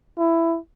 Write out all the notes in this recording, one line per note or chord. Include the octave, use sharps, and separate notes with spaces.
E4